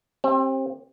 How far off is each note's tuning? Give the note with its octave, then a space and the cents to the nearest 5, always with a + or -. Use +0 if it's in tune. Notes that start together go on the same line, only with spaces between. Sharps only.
C4 +30 G4 +0